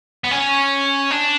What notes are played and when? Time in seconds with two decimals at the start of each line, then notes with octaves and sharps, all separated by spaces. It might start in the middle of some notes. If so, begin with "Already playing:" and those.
0.24 B3
0.31 C#4
1.11 D4